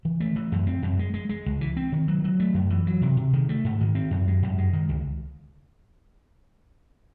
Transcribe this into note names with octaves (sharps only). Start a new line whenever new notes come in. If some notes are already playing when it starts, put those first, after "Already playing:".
E3
A3
E3
F#2
C4
F#2
G#3
G#3
G#3
C#2
E3
C4
D#3
F#3
F#3
A3
F#2
E3
F#3
C3
C3
D#3
A3
G#2
D#3
C4
F#2
G#3
F#2
G#3
D#3
C#2